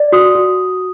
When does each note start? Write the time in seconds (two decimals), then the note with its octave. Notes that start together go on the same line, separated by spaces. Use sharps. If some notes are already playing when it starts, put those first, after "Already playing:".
Already playing: D5
0.12 F#4 D#6
0.35 F#4